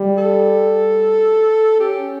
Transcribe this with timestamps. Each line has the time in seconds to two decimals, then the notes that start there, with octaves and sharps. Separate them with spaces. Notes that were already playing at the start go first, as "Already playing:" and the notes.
Already playing: G3
0.17 A4
1.79 C#4 G4